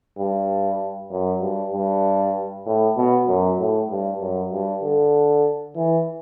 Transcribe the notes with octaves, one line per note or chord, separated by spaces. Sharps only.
G2
F#2
G2
G2
A2
B2
F#2
A2
G2
F#2
G2
D3
E3